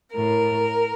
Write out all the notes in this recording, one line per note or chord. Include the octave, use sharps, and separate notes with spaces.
A2 A#4